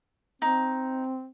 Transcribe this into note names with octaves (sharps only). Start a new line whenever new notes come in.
C4 D#4